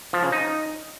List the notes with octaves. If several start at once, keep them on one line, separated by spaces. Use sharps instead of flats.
F3
C#3
D#4